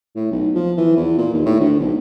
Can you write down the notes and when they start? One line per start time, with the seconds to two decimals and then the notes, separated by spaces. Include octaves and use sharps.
0.16 A2
0.31 B1
0.55 F3
0.77 E3
0.96 E2
1.18 A#2
1.34 D#2
1.46 A2
1.60 D2
1.80 B1